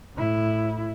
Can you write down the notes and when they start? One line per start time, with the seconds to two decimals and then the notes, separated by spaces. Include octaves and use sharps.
0.16 A2 E4